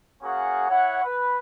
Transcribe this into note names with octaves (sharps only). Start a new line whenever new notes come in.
A#3 C#4 F#4 G#4 F#5
E4 C#5 F#5
B4